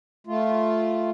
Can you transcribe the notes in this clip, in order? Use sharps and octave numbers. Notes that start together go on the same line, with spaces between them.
A3 F4